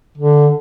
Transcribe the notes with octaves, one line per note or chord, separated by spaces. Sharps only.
D3